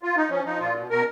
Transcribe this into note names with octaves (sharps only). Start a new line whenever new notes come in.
F4
D#4
F3 C#4
F3 D#4
A#2 F4
B2
B2 A#4